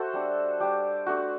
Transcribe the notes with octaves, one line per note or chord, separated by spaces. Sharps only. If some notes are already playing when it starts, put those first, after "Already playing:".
Already playing: F#4 A4 C5 E5
G3 D4
G3 D4 G4
A3 D4 F#4